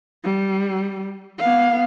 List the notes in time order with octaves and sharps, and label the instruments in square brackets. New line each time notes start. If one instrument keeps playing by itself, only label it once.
[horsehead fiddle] G3
B3 F5